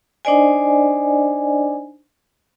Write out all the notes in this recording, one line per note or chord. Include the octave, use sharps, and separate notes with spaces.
D4 D#4 C5 D5 D#5 G#5